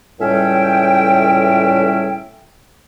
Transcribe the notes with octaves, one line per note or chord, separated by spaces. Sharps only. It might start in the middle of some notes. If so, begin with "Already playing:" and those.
C#2 A2 G3 C#4 E5 G5